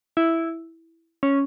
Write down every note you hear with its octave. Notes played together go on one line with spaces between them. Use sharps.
E4
C#4